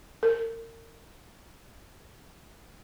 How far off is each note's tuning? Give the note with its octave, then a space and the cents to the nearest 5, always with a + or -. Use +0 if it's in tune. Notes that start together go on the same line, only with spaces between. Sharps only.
A#4 -35